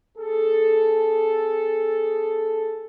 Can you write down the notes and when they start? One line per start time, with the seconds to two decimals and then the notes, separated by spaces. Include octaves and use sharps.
0.17 C4 G#4 A4